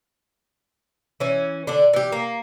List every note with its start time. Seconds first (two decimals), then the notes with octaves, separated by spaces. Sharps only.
1.20 E3 C#4
1.67 D3 D4
1.93 E3 G4
2.12 A#3